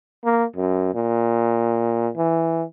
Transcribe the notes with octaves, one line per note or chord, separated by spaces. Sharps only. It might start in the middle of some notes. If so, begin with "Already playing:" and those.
A#3
F#2
A#2
E3